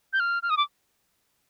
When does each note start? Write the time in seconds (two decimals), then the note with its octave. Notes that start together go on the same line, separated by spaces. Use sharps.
0.13 G6
0.20 F6
0.43 F6
0.50 D#6
0.57 D6